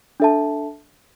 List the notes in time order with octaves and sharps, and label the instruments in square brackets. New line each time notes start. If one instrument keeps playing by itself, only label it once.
[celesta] D4 A4 E5 A5